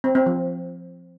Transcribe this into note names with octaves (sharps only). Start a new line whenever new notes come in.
C4
C4
F3